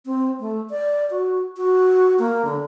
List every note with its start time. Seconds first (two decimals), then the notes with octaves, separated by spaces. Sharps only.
0.06 C4
0.40 A3
0.70 D5
1.11 F#4
1.57 F#4
2.19 A#3
2.45 D3